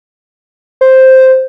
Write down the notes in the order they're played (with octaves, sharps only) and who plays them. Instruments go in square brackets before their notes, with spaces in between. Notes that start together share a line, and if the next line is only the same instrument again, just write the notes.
[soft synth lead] C5